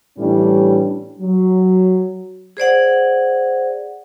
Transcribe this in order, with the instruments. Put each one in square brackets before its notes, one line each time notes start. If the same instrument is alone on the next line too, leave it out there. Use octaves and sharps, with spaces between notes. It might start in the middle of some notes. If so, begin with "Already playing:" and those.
[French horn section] A2 E3 G3 C#4 D4
F#3
[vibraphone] G#4 C5 D5 F#5